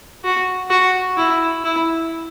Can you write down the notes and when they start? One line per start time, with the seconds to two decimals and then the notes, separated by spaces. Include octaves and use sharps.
0.24 F#4
0.70 F#4
1.17 E4
1.64 E4